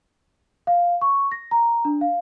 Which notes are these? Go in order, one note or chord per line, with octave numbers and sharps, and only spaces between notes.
F5
C#6
A#6
A#5
D4
F5